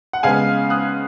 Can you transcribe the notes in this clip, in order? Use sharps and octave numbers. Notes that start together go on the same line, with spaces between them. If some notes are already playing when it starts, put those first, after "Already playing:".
F#5
C#3 G#3 B3 F5 G#5
D#6 F#6